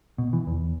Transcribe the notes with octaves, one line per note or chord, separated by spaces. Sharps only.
B2
E3
E2